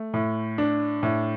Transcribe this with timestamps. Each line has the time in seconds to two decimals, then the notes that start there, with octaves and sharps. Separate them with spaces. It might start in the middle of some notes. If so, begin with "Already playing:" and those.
Already playing: A3
0.14 A2
0.58 D4
1.03 A2